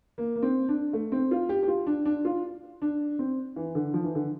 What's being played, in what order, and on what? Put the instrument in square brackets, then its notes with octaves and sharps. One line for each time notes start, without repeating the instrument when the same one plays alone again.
[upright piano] A#3
A#3
C4
D4
A3
C4
F4
G4
G4
F4
D4
D4
F4
D4
C4
E3
D3
F3
E3
D3